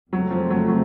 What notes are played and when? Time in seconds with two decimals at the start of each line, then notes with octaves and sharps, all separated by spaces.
0.12 F2 C#3 F#3 A3 C4
0.31 F3
0.50 F#3
0.68 F#3